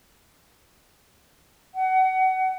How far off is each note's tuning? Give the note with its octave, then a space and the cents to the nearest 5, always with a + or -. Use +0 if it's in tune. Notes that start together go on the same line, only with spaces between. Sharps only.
F#5 +25